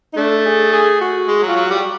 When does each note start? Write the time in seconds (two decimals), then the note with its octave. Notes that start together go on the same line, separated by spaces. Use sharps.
0.13 D#4
0.17 A3 D4
0.46 G#4
0.73 G#4
1.01 F#4
1.29 G#3
1.43 F#3
1.48 F4
1.56 F#3
1.66 G3 F#4
1.76 G4